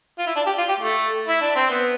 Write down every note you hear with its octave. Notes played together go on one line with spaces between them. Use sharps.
F4
E4
D4
G4
F4
G4
A3
E4
D4
C4
B3